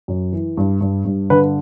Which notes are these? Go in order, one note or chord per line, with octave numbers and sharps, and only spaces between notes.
F#2
E3
G2
G2
G2
D3 B4